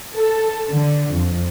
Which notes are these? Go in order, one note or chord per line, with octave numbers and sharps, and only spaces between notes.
A4
D3
F2